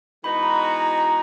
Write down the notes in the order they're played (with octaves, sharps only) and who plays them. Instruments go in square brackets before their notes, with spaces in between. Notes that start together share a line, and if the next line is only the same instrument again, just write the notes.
[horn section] E3 G#3 B3 D#4 F#4 [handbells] B5
[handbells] A#5
A#5
A#5